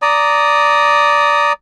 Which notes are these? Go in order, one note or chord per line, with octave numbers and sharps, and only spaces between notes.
D5 A#5 D#6